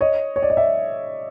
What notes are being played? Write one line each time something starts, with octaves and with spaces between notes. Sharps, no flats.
C#5 D#5
C#5
D5
D#5
D5 E5